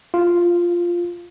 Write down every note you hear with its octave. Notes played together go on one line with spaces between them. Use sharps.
F4